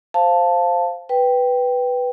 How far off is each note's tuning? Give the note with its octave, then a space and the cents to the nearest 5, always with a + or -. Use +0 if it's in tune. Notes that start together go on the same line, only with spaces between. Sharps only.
C5 +0 F5 +0 A5 +0
B4 +0 G5 +0